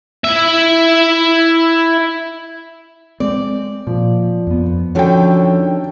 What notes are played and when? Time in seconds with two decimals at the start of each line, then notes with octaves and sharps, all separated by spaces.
0.24 E4 E5
3.20 G#3 C4 D5
3.87 A#2 F3
4.47 F2 B3
4.95 D3 D#3 F3 C#4 F#4 A4 G5